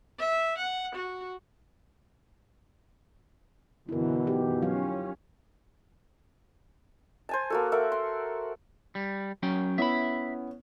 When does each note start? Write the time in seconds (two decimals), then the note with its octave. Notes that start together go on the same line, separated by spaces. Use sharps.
0.19 E5
0.58 F#5
0.95 F#4
3.89 F#2 B2 D3 E3 E4 A#4
4.27 D#4 G4
4.62 F#3 C#4 F4 F5
7.29 C5 G#5 A5
7.50 A#3 F#4 A4
7.72 A4 A#4 E5 F#5
7.92 C6
8.95 G3
9.43 F#3 C#4 G5
9.78 B3 C#4 E4 E5 B5